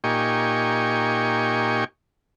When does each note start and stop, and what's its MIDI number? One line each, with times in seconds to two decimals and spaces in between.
0.04 1.84 46
0.04 1.84 63
0.04 1.84 67
0.04 1.84 80
0.04 1.84 85